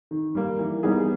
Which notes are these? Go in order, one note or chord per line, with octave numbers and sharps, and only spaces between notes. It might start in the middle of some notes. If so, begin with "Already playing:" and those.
D#3
G3 A#3
E3
G3 B3 D#4 G#4